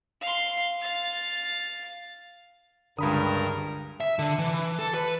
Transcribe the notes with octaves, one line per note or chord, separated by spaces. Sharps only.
F5 C6
F5 A6
C#2 G2 D3 A#4 B5 D#6
E5
D3
E3
A4
B4